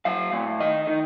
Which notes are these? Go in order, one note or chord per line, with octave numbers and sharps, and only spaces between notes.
F#3 F5
A2
D#3 D#5
D#3